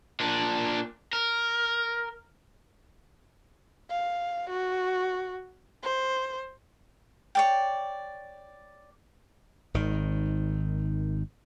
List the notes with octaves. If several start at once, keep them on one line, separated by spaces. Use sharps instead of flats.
A#2 D4
A#4
F5
F#4
C5
C#5 D5 G5
G#1 D#3